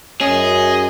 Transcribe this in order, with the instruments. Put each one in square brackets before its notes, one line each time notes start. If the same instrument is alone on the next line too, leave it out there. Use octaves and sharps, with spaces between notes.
[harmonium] F#2 [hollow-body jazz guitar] C#4 [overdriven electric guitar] G#4 [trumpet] D#5